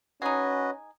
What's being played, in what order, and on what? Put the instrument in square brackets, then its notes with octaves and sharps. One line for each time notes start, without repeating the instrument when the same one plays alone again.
[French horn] C#4 [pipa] D#4 G#4 [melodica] F#4 B4 D#5